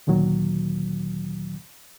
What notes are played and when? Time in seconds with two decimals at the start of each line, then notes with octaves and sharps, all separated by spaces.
0.07 D2 A#2 D#3 F#3